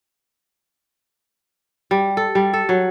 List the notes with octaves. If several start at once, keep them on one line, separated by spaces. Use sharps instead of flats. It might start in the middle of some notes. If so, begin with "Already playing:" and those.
G3
A4
G3
A4
F#3